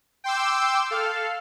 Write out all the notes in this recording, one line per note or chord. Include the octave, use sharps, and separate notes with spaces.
G5 C6 D6 E6
A4 F5